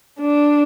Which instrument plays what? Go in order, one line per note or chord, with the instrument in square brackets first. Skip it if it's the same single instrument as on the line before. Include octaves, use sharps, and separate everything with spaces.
[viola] D4